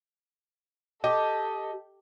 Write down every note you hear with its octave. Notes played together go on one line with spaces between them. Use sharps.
G4 A4 D#5